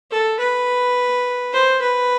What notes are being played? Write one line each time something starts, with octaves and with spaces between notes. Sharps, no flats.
A4
B4
C5
B4